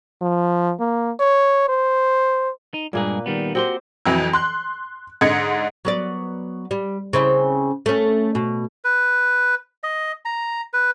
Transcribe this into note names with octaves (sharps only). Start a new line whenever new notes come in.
F3
A#3
C#5
C5
D#4
G2 A#2 G#3 A#3 G#4 B4
D#3 G3 B3
C4 F#4 G4 C5 G5 C6
F2 E3 F#3
C6 F#6
G#2 D3 D#5 G#6 C#7
F#3 B3 D5
G3
C#3 C4 E4
A3 C#4
B2
B4
D#5
A#5
B4